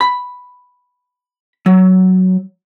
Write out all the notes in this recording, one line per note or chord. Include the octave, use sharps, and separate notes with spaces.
B5
F#3